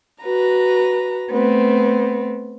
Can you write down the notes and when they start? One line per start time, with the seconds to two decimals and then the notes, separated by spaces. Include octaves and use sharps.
0.22 F#4 B4 A#5
1.31 A3 B3 C4